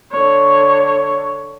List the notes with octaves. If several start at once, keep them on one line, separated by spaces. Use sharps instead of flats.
D3 C#5